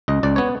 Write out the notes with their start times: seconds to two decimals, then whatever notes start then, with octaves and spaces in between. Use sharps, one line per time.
0.08 C#2 D#5
0.23 C#2 D5
0.36 B3 C#5